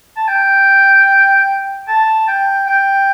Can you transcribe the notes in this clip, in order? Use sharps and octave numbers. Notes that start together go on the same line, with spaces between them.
A5
G5
A5
G5
G5